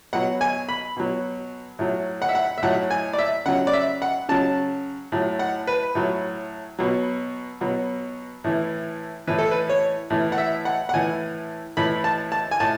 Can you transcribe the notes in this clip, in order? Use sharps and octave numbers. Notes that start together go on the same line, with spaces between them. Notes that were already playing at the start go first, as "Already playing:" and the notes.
B2 F#3 F#5
G#5
B5
B2 F#3
A2 F#3
F#5
E5
F#5
E5
A2 F#3 F#5
G#5
D5
E5
C#3 F#3 F#5
D5
E5
F#5
C#3 F#3 A5
A2 F#3
F#5
B4
A2 F#3
B2 F#3
B2 F#3
A2 E3
A2 E3 B4
A4
B4
C#5
A2 E3
F#5
E5
F#5
F#5
A2 E3 G#5
A2 E3 B5
A5
A5
G#5
A2 A5